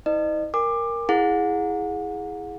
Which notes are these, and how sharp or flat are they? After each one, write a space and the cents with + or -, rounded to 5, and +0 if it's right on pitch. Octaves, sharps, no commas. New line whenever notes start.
E4 -45 C5 -25 D#5 -40
A#4 +0 G#5 -45 D6 +20
E4 +0 G#4 +0 F#5 -35